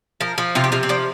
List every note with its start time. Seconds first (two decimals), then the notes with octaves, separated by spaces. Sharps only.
0.21 F3 A#4
0.38 F3
0.55 C3 F4
0.64 G4
0.72 C3 F4
0.83 C4
0.89 F3 D4